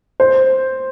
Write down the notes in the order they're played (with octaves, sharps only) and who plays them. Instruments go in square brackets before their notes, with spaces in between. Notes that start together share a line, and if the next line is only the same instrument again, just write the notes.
[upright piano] C5